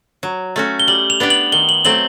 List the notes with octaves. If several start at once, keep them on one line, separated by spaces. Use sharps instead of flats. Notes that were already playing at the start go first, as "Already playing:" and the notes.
F#3
A3 C#4 F#4
G7
G3 F#7
F7
B3 D4 G4
F#7
D#3 G7
F#7
F#3 A3 C4 F#7